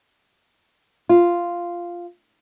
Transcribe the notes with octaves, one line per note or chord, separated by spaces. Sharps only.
F4